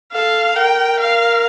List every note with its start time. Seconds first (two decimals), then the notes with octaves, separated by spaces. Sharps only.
0.12 A4 F5
0.56 A#4 G5
0.99 F5